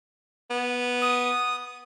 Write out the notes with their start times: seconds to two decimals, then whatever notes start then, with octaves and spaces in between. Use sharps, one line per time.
0.50 B3
1.02 D#6